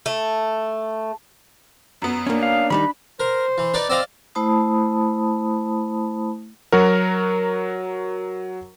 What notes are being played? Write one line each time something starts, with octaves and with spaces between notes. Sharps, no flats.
A3
F#2 B3
A#3 C#4 D4
F5
D#3 G3 D#4 B5
A#4 C5
E3
D#4 B4 D5
C4 D5 D#5 F5 E6
A3 E4 C5 A5 B5 D#6
F#3 F#4 A#4